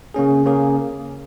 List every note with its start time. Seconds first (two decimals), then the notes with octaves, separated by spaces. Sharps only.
0.14 C#3 A#3 C#4 G#4
0.45 C#3 A#3 C#4 G#4